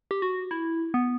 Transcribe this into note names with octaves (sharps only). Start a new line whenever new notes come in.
G4
F#4
E4
B3